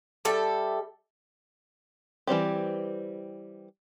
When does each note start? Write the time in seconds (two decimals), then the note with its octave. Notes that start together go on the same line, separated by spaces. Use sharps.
0.25 G3 A4 E5
2.27 E3 G3 C4 G4